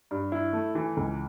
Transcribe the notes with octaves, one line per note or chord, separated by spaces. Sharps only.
G2
E4
A3
E3
C#2